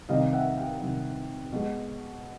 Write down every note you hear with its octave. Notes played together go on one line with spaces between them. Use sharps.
C3 D#3 G3 D#5 F5
E5 F#5
F5 G5
C3 D#3 G3
B2 G#3